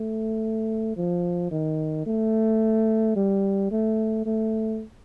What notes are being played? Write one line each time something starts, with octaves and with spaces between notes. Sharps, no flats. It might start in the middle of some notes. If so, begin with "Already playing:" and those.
Already playing: A3
F3
D#3
A3
G3
A3
A3